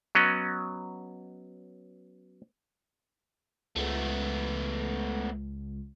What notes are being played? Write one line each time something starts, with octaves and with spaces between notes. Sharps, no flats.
F#3 B3 C#4 D#5
C#2 A3 B3